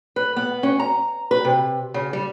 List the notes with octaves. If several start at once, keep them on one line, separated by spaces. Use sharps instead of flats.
B4
B3
C#4
A#5
B4
C3
C#3
G3